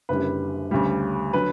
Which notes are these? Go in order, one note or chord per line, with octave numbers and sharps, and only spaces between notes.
F#1 F#2 D3 G3 B4
D2 C#3 G3
D3 F#3 B4